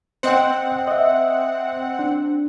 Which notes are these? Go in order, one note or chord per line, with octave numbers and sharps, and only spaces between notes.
C4 C5 D#5 F#5 G5
D#5 E5
D4